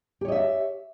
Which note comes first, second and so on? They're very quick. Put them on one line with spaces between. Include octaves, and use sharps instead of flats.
G4 C#5 D#5 E5